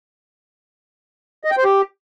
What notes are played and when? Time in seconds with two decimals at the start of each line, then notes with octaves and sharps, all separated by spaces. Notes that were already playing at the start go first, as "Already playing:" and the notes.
1.44 D#5
1.51 G5
1.58 C5
1.64 G4